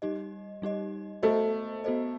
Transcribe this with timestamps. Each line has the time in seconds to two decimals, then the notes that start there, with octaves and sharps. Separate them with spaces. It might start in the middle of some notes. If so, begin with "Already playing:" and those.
0.02 G3 D#4 G4 D#5
0.62 G3 D#4 G4 D#5
1.23 A3 B3 F#4 A4 C5 D#5
1.84 B3 F#4 A4 C5 D#5